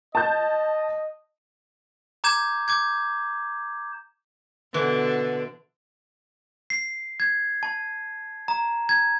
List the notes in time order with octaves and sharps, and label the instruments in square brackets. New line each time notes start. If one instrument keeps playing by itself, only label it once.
[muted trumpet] D#5 [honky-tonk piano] A5 G6
[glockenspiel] A#5 D6 G6 G#6 E7
D6 G6 G#6
[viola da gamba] B2 D3 [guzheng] E3
[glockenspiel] C7
G#6
A5
A#5
G#6